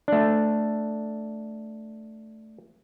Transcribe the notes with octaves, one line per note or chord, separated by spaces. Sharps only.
A3 D4